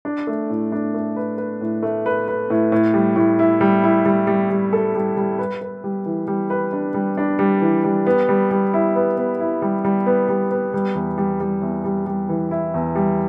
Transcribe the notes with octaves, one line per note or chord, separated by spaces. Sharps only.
D4
A3
A2
D4
A3
B4
B4
A2
A3
B4
B4
A2
A2
G3
A2
E4
G3
E4
G3
G3
G3
A4
G3
G3
B4
B4
G3
E3
G3
B4
D4
G3
D4
G3
E3
G3
B3
G3
G3
E4
B3
B3
E4
G3
G3
B3
G3
B3
G3
E2
G3
G3
E2
G3
G3
E3
E4
E2
G3